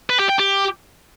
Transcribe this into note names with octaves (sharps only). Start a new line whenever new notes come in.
B4
G4
G5
G4